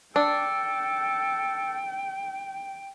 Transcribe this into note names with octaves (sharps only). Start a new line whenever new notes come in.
D4 A4 G5